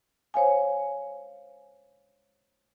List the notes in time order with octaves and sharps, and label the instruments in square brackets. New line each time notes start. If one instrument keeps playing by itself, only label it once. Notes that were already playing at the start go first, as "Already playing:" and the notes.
[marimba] C5 C#5 F5 G#5